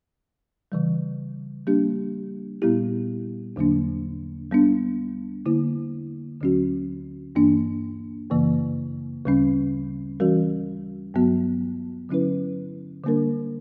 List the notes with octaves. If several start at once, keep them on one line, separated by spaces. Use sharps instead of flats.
C#3 E3 G3
G3 A#3 D4 G4
A#2 G3 B3 E4 G4
E2 D3 F#3 A#3 D4
G3 B3 D4
D3 A#3 E4
D2 D3 F#3 C#4 F#4
G2 E3 A#3 D4
F#2 C#3 E3 A#3
D2 C#3 G3 C#4
E3 G3 C#4 F#4 A#4
G2 F#3 B3 F#4
D3 F#3 C#4 E4 B4
D3 G3 A#3 D4 A#4